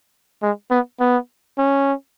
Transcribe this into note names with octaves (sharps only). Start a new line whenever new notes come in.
G#3
B3
B3
C#4